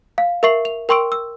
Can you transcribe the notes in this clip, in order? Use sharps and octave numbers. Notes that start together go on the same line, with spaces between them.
F5
A#4 E5 C#6 C7 F#7
F7
A#4 G5 C6 C#6 E6 D7
E6